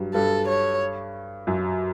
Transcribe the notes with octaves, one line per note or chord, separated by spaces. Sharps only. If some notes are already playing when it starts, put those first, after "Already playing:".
Already playing: G2 F#3 G3
G2 G3 A4
C#5
F#2 F#3